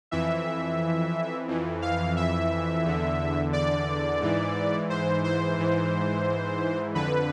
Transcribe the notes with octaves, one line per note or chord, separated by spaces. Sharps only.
F2 E3 E5
F2 E3
F5
E5
E2 D3
D5
G#2 E3
C5
C5
G#2 E3
F2 D3 B4